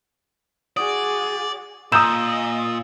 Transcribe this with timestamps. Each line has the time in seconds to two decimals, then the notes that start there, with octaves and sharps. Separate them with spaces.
0.77 F#4 G#4 D5 D#6
1.92 A#2 D#5 A#5 D#6 E6 G6 E7